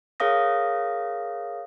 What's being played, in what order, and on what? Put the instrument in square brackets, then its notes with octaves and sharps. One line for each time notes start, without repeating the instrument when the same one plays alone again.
[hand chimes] G#4 A#4 C#5 F5 D#6 A#6